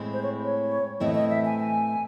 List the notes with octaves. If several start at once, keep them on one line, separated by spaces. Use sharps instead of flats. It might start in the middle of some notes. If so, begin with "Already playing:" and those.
Already playing: A2 G#3 C4 E4
C5
C#5
C#5
A2 E3 A3 C4 E4 D#5
D#5
E5
G#5
G#5